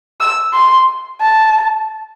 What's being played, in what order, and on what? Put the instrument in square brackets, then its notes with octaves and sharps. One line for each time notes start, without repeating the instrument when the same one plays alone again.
[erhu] E6
C6
A5